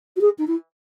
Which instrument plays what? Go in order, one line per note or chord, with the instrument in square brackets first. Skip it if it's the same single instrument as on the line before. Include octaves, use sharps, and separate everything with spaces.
[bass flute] F#4
G#4
D#4
E4